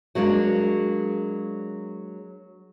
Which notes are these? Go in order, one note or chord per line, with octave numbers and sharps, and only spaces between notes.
F#3 G#3 A#3 D4